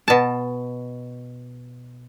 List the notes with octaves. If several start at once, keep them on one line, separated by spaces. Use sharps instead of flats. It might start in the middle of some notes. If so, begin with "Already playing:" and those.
B2 A5